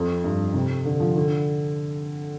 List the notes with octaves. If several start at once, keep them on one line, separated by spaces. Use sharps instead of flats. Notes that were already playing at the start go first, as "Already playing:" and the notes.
Already playing: F2
G2
C3
D3
F3
D3